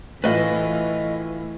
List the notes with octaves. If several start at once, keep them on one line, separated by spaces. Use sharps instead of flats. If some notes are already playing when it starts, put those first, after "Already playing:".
A2 E3 F4 B4 D#5